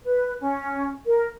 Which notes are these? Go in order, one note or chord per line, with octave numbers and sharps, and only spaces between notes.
B4
C#4
A#4